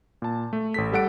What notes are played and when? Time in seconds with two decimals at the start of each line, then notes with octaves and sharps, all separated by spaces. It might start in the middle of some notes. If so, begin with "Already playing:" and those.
0.22 A#2 A5
0.53 A3
0.74 A1 A4 B6
0.92 G3 A4 F#5 D7